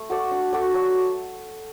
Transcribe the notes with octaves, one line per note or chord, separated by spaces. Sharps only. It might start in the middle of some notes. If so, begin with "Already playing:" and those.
Already playing: A3
F#4 A4 D5
D4
F#4 A4 D5
F#3